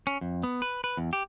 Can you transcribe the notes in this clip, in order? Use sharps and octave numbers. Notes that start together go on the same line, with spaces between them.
C#4
F2
B3
B4
B4
E2
G4